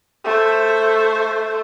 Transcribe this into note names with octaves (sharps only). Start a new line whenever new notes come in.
A3 C5